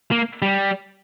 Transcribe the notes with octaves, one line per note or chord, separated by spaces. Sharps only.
A#3
G3